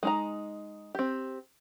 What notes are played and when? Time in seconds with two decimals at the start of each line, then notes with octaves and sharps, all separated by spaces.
0.03 G#3 D#4 A#5
0.95 C4 G4